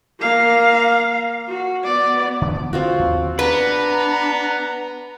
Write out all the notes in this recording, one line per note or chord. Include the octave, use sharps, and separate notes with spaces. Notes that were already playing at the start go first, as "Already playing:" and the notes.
A#3 F5
F#4
B3 D5
D3 F3 D4
D3 C4 F4 F#4
D#2
B3 D4 B4 A#5